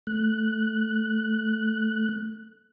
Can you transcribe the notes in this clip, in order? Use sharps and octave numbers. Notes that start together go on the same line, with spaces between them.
A3 F#6